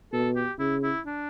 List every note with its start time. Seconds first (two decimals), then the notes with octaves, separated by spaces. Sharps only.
0.13 B2 A4
0.35 G4
0.59 C#3 E4
0.83 E4
1.06 D4